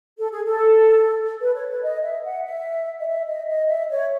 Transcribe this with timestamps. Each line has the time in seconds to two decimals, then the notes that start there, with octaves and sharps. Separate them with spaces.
0.18 A4
0.31 G#4
0.45 A4
1.41 B4
1.55 C#5
1.69 B4
1.83 D#5
2.04 E5
2.24 F#5
2.45 E5
3.00 D#5
3.07 E5
3.27 D#5
3.48 D#5
3.69 E5
3.90 C#5